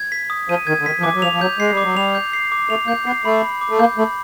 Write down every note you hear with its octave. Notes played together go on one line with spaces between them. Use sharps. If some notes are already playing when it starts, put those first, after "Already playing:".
Already playing: G#6
B6
D#6
F3 D#7
D#3 G#6
D3
D#3 B6
F3
E3 D6
F#3
F3 F7
F3
F#3 G6
G#3 C7
G3
D6
F#3
G3 F7
G6
C7
D6
A3 F7
A#3 G6
B3 C7
A3 B5
B5
D6
A3
A#3 G6
A3 B5